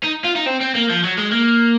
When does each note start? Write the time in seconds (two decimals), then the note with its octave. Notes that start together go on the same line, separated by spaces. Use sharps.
0.04 D#4
0.25 F4
0.36 D#4
0.46 C4
0.61 C4
0.75 A#3
0.90 F3
1.03 F#3
1.18 G#3
1.32 A#3